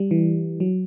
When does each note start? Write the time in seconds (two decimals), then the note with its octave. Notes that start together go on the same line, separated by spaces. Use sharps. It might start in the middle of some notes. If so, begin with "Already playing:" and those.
Already playing: G3
0.11 E3
0.60 F#3